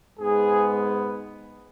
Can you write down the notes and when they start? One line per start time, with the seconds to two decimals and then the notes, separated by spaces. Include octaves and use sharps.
0.19 G#2 G#3 B3 G#4